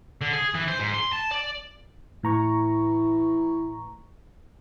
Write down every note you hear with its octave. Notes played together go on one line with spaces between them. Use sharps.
D3
G#4
E3
C5
G#2
C6
A5
D5
A2 E3 A#5 C#6